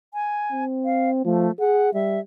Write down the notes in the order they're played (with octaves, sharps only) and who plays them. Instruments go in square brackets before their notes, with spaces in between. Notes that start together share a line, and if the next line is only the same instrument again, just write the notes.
[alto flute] G#5
[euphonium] C4
[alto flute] F5
[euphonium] F3 [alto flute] A3
[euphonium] G#4 [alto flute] F#5
[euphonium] G3 [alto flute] E5